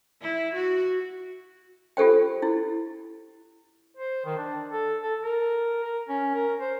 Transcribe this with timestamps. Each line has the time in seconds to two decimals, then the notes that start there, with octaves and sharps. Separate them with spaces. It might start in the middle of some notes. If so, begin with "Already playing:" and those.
0.22 E4
0.54 F#4
1.97 F4 G4 A4 C5 G5
2.42 E4
3.97 C5
4.25 D#3
4.37 D4
4.72 A4
5.02 A4
5.22 A#4
5.84 A#4
6.09 C#4
6.34 A#4
6.60 C5